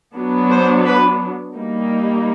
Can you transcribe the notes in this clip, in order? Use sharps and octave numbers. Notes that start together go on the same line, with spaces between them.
F#3 B3 D4
C5
B4
G3 A#3 D#4